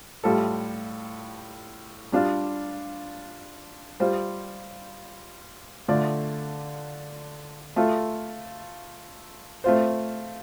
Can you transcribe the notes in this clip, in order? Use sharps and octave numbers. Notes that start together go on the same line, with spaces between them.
A2 G3 F4 A4
G3 D4 F4
G3 F4 C5
D3 A3 F4 D5
A3 F4 A4
A3 C4 F4 C5